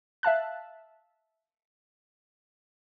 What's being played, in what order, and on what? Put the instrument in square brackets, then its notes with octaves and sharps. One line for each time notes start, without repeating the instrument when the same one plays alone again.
[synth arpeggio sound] E5 F5 A5 F#6